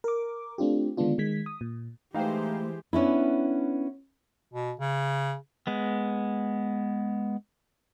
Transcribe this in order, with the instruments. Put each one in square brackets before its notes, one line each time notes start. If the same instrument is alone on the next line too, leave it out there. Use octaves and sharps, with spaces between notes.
[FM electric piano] A#4 D6
A3 C4 D4 F4 G4
D3 D#3 G#3 B3 D4 F4
D#3 G#3 G#6 B6
D#6
A#2
[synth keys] E3 C5 [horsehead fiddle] G#3 G4 [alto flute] A3 [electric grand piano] D#4 F5 G5
[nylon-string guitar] B3 C#4 D4 E4
[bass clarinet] B2
C#3
[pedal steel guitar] G#3 B3